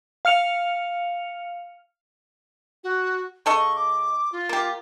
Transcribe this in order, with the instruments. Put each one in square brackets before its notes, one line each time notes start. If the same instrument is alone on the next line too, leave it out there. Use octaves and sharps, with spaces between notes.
[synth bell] F5 F6 C#7 F7
[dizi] F#4
[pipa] C#3 A4 D#5 [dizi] C#6
[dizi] D6
F4
[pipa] A#3 G4